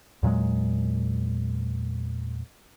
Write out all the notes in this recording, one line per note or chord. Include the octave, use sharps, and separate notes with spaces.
E2 A#2 F#3 G#3